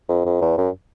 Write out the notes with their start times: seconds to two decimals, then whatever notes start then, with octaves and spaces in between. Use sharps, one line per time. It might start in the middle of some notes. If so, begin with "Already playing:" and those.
0.09 F2
0.25 F2
0.41 E2
0.58 F#2